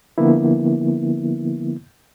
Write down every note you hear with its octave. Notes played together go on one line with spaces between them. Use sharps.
D3 F3 A#3 B3 E4